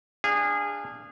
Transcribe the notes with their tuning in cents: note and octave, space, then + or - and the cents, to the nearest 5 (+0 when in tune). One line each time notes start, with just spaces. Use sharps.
D4 +0 G#4 -25 F5 -15